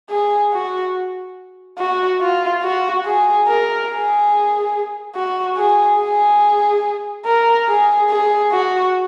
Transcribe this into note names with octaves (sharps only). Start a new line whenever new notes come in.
G#4
F#4
F#4
F4
F#4
G#4
A#4
G#4
F#4
G#4
G#4
A#4
G#4
G#4
F#4